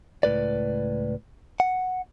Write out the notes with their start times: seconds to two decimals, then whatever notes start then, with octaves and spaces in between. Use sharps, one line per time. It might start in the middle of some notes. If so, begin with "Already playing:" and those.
0.23 C#2 A2 B4 D5
1.60 F#5